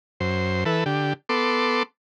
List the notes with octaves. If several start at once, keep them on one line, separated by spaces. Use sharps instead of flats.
F#2 C5
E3 A4 B4
D3 G4
B3 A4 C6 D6